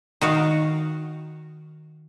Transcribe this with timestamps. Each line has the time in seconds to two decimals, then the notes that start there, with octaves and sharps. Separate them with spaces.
0.21 D#3 F#4 F5